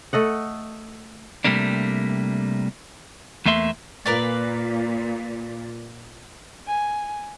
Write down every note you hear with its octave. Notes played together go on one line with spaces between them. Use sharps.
A3 A4 D#5 F#5
C3 G3 A3 A#3 D4
E2 A3 A#3 E5 C6
A#2 A#4 B4 D5
G#5